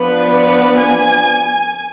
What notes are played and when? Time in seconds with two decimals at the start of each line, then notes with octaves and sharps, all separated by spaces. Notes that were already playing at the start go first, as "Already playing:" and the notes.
Already playing: F3 B3 D4 B4
0.79 G#5